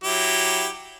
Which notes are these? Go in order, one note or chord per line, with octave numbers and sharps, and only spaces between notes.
F#3 E4 G4